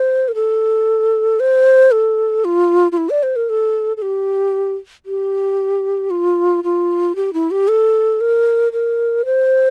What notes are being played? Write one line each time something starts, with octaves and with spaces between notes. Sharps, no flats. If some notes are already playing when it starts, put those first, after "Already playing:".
Already playing: C5
A#4
A4
C5
A4
F4
F4
E4
D5
C5
A#4
A4
A4
G4
G4
F4
F4
G4
E4
G4
A4
A#4
A#4
C5